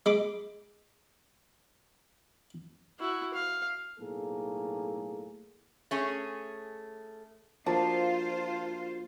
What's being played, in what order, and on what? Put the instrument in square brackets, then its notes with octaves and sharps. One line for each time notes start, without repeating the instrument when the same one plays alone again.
[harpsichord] G#3 B5 D6
[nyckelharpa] E4 F#4
F5
[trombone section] B1 A2 A#3 G#4 A4
[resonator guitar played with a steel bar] A3 C#4 G#4
[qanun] F3 [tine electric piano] A#3 D4 F#4 [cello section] F4 C5 [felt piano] A5